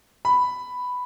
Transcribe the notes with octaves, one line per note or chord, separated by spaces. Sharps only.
B5